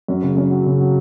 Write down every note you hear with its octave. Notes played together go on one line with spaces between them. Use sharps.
F#2
C#3
F#2
F#3
C#3
F#3